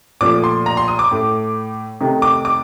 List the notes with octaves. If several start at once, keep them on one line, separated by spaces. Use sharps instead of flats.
A#2 F3 A3 D6
C6
A#5
C6
D#6
D6
A2 A3
C3 D#3 A3
D6
D6